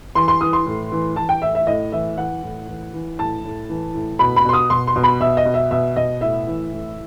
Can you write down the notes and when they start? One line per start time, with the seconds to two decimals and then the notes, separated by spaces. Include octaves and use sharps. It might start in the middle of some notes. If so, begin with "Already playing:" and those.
0.15 E3 C6
0.28 C6
0.41 E3 D#6
0.53 C6
0.66 A2
0.92 E3
1.16 E3 A5
1.29 G5
1.42 A2 E5
1.55 E5
1.67 A2 D#5
1.92 E3 E5
2.17 E3 F#5
2.43 A2
2.67 E3
2.93 E3
3.18 A2 A5
3.44 A2
3.69 E3
3.94 A2
4.19 B2 B5
4.36 B5
4.45 B2 C6
4.53 D#6
4.70 B2 C6
4.87 C6
4.96 B2
5.04 B5
5.20 B2 E5
5.37 D#5
5.45 B2
5.54 E5
5.71 B2 E5
5.96 B2 D#5
6.21 A2 E5
6.47 E3
6.72 A2